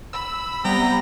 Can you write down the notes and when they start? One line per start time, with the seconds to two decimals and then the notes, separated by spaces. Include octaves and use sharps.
0.13 B5 E6
0.65 C3 G3 B3 G5 A#5